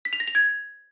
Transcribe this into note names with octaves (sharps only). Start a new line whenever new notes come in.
B6
F7
A#6
F7
G#6